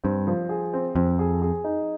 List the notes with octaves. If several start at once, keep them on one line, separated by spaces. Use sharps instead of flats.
G2 C4
F3
G#4
C4
F2 C4
G#4
G#4
D#4